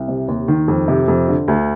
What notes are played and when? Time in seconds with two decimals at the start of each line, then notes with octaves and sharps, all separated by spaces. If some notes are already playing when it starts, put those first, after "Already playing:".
Already playing: C2
0.08 C3
0.28 D#2
0.48 D#3
0.68 F2
0.88 C3
1.08 F2
1.28 D3
1.48 D2